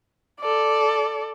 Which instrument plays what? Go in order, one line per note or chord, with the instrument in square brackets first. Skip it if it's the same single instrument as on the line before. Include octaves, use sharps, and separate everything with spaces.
[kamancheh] A4 D5